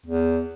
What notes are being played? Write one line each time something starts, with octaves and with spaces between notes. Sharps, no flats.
E2